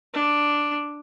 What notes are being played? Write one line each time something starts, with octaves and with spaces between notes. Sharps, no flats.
D4